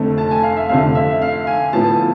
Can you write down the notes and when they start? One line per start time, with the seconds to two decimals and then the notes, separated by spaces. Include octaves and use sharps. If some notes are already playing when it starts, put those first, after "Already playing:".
Already playing: F1 F2 D3 A3
0.18 A5
0.31 G#5
0.43 F5
0.57 E5
0.69 F1 F2 D3 F5
0.95 E5
1.22 F5
1.47 G#5
1.73 A2 F3 B3 E4 A5